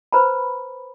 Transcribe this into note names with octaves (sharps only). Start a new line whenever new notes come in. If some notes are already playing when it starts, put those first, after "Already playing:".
B4 C5 A#5 B5